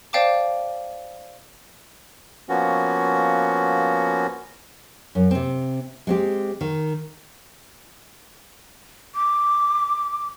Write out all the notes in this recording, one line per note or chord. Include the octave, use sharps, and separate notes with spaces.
C5 D5 F5 G5 A5 D6
F3 A#3 B3 C#4 F#4
F#2
C3 C4
G#3 C4 G4
D#3
D6